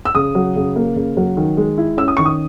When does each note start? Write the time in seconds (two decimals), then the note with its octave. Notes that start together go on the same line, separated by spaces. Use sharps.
0.05 E6
0.15 C#3 D#6
0.35 F#3
0.56 C#3
0.76 A#3
0.96 C#3
1.17 F#3
1.37 D#3
1.57 G#3
1.78 E4
1.98 C#4 E6
2.08 D#6
2.17 D#3 C#6
2.25 D#6